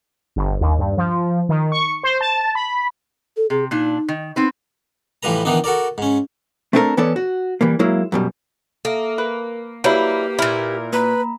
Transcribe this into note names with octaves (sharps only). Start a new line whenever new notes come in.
G1
D#2
G2
F3
D#3
C#6
C5
A5
B5
A4
C3 G#4
A#2 D4 D#4
D#3
B3 C4 D#4 B4
A2 E3 F3 G3 B4 A#5
D#3 E3 B3 D4 D#4
F#4 A4 A#4 D5
G#2 C#4
A3 C4 D4 E4 A4 A#4
E3 B3 C#4 A4 D5
F#4
E3 G3 A#3
F#3 G#3 A#3 E4
F#2 B2 G3
A#3 A4 E5
A#4 B4
F#3 G3 A#3 E4 G4 B4 G6
A#2 E4 A#4
A#3 B4 A#5 B5